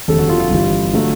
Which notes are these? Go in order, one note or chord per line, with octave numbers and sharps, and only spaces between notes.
F1 D#2 D3 G3 A4
F#4
F4
F4
G1 G2 E3 G3
D3 F#3 A3